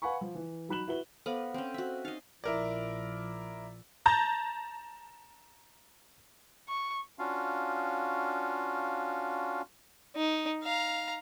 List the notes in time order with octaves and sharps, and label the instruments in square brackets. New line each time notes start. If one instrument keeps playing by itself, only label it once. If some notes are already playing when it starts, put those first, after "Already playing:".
[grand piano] B4 F5 F#5 G#5 B5 C#6
F3
E3
F#3 D#4 B5 F#6 E7 F#7
E4 F#4 B4 G7
[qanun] B3 [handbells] A4 C5 F5
[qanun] C4 C#4
F#4 E5
[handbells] D#4 [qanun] D#5 F5
[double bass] A#1 F3 [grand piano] E4 A#4 D5
[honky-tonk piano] A5 A#5 G6 A#6
[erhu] C#6
[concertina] C#4 D4 F4 F#4 F5
[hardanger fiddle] D#4
F5 A#5